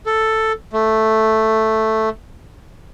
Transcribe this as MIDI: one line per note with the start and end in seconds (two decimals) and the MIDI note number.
0.06 0.52 69
0.73 2.09 57